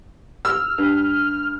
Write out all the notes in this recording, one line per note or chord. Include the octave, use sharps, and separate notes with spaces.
E6 F6
G2